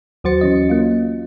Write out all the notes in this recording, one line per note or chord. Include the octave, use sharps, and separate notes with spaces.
D#2 F#3 F#4 C5 A6 C#7
E3 C#4 D#5
A#3 F4